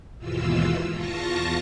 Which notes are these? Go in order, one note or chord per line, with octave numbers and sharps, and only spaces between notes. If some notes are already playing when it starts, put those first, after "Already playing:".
D#2 G#2 B2 E3 F4 E6
E2 F4 A5 C#6 A#6 C#7